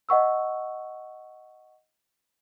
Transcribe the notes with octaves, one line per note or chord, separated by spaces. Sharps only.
D#5 F#5 C#6 E6